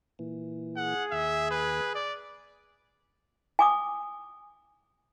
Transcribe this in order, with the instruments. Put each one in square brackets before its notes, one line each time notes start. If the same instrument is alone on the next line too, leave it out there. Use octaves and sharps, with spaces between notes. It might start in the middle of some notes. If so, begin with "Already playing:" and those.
[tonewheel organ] A#2 E3
[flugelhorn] G#4 [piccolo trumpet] F#5
[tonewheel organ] D#2 [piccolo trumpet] E5
[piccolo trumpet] B4
D5
[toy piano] G#5 D6 D#6